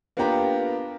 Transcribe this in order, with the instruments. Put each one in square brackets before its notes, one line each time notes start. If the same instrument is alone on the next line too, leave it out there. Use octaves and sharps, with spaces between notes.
[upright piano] A#3 B3 D4 F4 G4 A#5